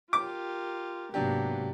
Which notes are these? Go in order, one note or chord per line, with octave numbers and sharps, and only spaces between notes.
F4 G4 A#4 D6
G#2 C3 F#3 A#3 B3 D4 G4